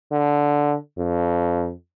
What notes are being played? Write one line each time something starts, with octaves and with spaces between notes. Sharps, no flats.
D3
F2